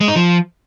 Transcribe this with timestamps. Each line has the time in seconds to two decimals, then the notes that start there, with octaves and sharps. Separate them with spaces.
0.01 G#3
0.08 D#4
0.16 F3